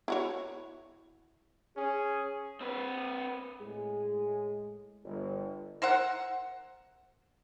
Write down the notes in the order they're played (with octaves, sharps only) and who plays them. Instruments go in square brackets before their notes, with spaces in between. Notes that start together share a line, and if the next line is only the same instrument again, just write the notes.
[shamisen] E4 F#4 C#5
[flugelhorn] C#4 [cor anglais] G#4
[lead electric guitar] C4 B4
[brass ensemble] A2 G#3 G#4
G1
[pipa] A#4 C5 E5 F#5